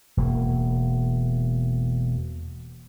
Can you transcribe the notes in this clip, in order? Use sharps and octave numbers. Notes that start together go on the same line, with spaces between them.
E1 A#3